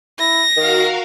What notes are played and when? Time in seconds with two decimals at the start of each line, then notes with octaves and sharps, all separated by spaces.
0.19 E4 A#6
0.57 D#3 F#4 A#4 F5